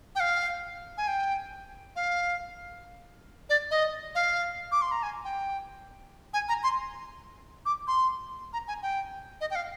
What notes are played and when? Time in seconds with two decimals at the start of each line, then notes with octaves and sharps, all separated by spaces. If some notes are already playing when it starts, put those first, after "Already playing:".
0.15 G5
0.20 F5
0.98 G#5
1.08 G5
1.96 F5
3.50 D5
3.71 D#5
4.15 F5
4.72 D6
4.82 C6
4.92 A#5
5.03 G#5
5.24 G5
6.34 G#5
6.49 A#5
6.63 C6
7.66 D6
7.88 C6
8.53 A#5
8.68 G#5
8.83 G5
9.41 D#5
9.51 G5
9.55 F5